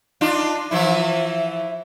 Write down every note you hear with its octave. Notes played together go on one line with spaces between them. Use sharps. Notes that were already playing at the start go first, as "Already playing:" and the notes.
D4 D#4 F4
E3 F3 E4 E5